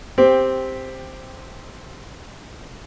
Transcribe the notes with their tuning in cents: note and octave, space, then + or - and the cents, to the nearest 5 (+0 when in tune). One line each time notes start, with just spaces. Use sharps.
C4 +0 G4 +10